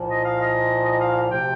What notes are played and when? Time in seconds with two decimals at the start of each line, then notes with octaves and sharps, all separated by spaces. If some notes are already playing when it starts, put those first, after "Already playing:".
Already playing: C2 A#2 F3
0.09 D#5
0.23 F5
0.39 D#5
0.84 D#5
0.99 F5
1.29 D2 C3 F3 G5